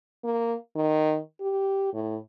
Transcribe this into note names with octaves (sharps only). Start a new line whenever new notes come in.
A#3
D#3
G4
A2